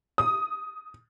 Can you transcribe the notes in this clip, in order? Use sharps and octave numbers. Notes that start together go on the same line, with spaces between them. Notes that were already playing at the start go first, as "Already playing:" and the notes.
D#6